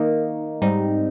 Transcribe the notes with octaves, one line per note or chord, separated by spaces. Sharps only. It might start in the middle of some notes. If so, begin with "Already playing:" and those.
Already playing: D#3 A#3 D#4
G#2 G3 C4 D#4